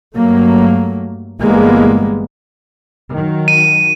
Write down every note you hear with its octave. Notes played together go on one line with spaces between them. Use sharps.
G2 F#3 A3 A#3
G1 E3 G3 G#3 A#3 B3
D#3 F#3
D#7